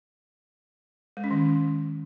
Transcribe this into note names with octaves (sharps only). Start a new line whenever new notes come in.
G#3
C#4
D#3